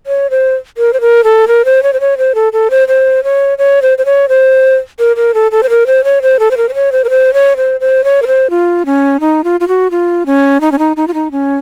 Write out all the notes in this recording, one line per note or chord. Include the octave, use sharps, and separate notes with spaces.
C#5
C5
A#4
C5
A#4
A4
A#4
C5
C#5
C5
C#5
C5
A4
A4
C5
C5
C#5
C#5
C5
C5
C#5
C5
A#4
A#4
A4
A4
C5
A#4
C5
C#5
C5
A4
C5
A#4
C5
C#5
C5
A#4
C5
C#5
C5
C5
C#5
A#4
C5
F4
C#4
D#4
F4
F4
F#4
F4
C#4
D#4
C#4
D#4
D#4
F4
D#4
C#4